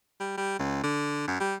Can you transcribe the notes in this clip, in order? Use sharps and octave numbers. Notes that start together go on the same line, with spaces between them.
G3
G3
C#2
D3
F#2
G3